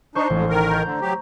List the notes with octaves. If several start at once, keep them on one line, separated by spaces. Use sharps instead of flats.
D4 D#4 C5 C#6
A1 F2 G#2
D#3 A#4
A#5 G6
D3
F#3 G4